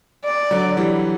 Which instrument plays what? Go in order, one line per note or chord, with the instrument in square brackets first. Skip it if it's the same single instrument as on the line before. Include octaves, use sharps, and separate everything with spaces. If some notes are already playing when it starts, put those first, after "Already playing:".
[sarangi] D5
[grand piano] D3 F#3
E3 G3